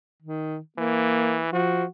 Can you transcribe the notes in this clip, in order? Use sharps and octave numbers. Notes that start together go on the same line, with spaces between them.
D#3
E3 A#3
F3 F#4